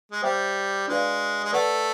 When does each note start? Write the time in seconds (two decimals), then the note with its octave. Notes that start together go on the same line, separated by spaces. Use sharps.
0.12 G#3
0.22 G3 C5 E5 G5
0.88 G#3 D4 F#4 B4 D5 F5
1.44 G#3
1.52 A3 B4 D5 F#5